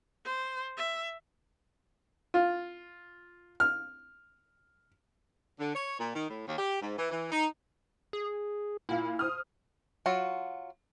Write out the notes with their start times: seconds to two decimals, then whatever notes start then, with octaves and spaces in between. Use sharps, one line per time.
0.25 C5
0.77 E5
2.34 F4
3.60 F6
5.59 D3
5.75 C#5
5.99 A#2
6.14 D#3
6.29 A2
6.47 D#2
6.58 G4
6.82 G#2
6.98 E3
7.11 E3
7.32 D#4
8.13 G#4
8.89 A#2 E4 F4 F5
9.19 C5 D#6 F6
10.06 F#3 F4 F#4